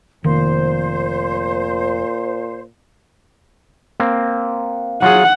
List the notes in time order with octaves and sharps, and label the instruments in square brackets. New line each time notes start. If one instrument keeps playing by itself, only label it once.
[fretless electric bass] F1 A#3 [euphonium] A#2 [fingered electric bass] D#3 [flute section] C5
[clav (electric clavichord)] A#3 C4
[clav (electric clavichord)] F#3 F4 G#4 [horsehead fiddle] F#5